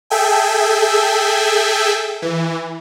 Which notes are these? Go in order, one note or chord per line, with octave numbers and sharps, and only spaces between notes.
G#4 A4 E5 G5 G#5
E3